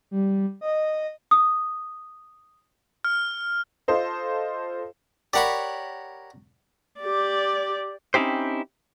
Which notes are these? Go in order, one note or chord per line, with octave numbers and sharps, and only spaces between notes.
G3
D#5
D#6
F6
F4 A4 C5 D#5
G4 A#4 C#5 D5 F#5 B5
G4 D5
C4 C#4 D#4 E4 G4 C5